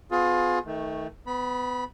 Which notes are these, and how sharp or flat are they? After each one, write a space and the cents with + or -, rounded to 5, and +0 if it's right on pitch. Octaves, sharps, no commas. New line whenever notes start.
B3 +40 F4 +30 G#4 +25
D#3 +25 A3 +0
B3 +25 B5 -20